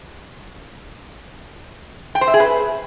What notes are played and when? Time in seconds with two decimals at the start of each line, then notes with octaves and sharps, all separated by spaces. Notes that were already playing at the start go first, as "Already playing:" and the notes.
2.15 G5
2.21 C5
2.28 E5
2.34 G#4
2.40 B4